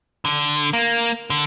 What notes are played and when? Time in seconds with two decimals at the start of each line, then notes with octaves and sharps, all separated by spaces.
0.25 D3
0.73 A#3
1.30 D3